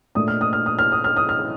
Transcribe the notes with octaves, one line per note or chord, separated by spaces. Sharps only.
A#2 A3 D4 D#6
F6
D#6
F6
D#6
F6
D#6
F6
D#6
F6